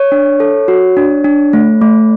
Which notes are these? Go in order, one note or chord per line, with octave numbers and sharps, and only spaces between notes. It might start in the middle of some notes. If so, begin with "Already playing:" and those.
Already playing: C#5
D4
A4
F#4
D4
D4
A3
A3